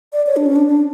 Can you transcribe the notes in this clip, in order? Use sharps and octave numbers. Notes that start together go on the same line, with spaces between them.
D5
C#5
D4
C#4
D4
D4